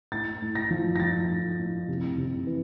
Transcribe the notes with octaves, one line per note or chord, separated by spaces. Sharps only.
A2 A6
A2
A#6
F3
A#6
F3 A6
A2
A2
C3
C3
E3